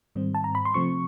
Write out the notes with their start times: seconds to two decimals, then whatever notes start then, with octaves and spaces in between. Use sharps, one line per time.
0.15 G#2 D#3 G3 C4
0.35 A5
0.44 A#5
0.55 B5
0.65 C6
0.74 C3 F3 A3 C4 C#6